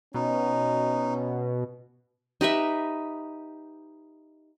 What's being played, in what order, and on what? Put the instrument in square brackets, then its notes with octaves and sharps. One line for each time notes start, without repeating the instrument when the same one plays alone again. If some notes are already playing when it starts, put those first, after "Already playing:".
[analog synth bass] B2 [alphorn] C#4 [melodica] D#4
[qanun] D#4 G4 B4 E5